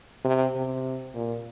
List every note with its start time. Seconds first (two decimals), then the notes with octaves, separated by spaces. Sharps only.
0.25 C3
0.55 C3
1.14 A#2